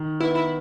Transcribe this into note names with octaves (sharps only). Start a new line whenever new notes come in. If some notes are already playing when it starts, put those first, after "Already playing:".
Already playing: D#3
B3 E4
E4